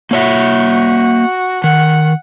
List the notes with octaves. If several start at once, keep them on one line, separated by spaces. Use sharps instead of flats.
A#3 F#4 C#5 E5
D#3 F#5